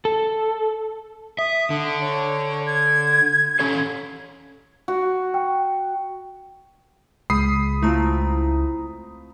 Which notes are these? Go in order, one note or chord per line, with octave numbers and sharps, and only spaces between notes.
A4
E5 D#6
D3
C#5
G#6
C#4 A4 C#5
F#4
G5
C#2 G#3 B5 D#6 C7
A3 C4 E4 F4 A#5